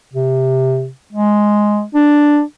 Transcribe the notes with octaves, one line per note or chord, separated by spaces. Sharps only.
C3
G#3
D4